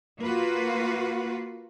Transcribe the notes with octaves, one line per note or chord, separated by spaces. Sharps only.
A#3 F4 F#4 B4